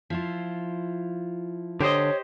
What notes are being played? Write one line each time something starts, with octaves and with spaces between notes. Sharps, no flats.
F3 E4 F4
D3 G4 C5 C#5 D#5